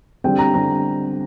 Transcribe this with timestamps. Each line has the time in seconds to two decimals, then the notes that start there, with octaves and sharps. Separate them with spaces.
0.24 D3 G3 C4 G5
0.39 A#5
0.54 D3 G3 C4 A#5